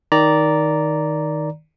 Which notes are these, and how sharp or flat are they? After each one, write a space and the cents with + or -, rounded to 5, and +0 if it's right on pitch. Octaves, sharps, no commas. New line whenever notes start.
D#3 +5 D5 -10 A#5 +0